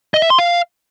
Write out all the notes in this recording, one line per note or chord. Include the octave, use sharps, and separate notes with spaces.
D#5
E5
C6
F5